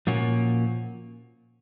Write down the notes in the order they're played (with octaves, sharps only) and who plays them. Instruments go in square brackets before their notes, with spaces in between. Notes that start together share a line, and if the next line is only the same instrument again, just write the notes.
[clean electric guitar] A#2 F3 A#3 C#4 F#4